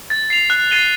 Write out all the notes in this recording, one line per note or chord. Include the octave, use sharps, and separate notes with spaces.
A6
C7 F7
F#6
A6 C7 D#7 G7